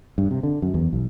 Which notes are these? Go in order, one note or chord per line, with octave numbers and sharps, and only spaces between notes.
G2
C3
D3
F#2
E2
B1